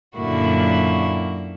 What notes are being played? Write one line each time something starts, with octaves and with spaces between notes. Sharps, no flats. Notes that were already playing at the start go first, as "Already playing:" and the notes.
F#2 A#2 D3 A#3 E4 F#4